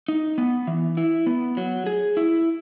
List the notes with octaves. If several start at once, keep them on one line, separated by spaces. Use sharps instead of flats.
D#4
B3
E3
E4
B3
F#3
G#4
E4